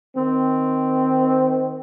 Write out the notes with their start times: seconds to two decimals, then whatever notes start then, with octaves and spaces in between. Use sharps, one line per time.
0.16 D#3 C4